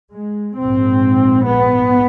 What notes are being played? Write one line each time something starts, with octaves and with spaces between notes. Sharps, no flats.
G#3
A#1 G#2 C4
B3